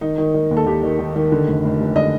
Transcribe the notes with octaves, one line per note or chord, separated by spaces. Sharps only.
D#3 D#4
D#3
D#3
D#2
A4
D#2 G4
D#3
D#3
D#3
D3
F1
F1
F1
D3 D#5